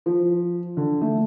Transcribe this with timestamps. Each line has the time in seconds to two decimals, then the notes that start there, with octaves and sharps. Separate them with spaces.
0.06 F3
0.77 D3
1.01 A3